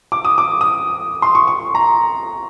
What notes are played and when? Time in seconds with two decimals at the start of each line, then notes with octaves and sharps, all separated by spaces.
0.12 D6
0.25 D#6
0.38 D6
0.61 D#6
1.22 C6
1.35 C#6
1.48 C#6
1.75 A#5